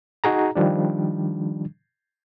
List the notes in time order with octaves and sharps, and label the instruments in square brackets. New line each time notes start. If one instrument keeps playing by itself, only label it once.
[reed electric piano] D#4 F#4 G#4 A#5
D#3 F3 G3 D4